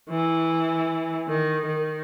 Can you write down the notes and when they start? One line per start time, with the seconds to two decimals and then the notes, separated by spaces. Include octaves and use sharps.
0.09 E3
1.28 D#3
1.67 D#3